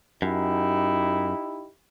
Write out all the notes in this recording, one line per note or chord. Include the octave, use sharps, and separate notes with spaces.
F#2 D#4 E4 G4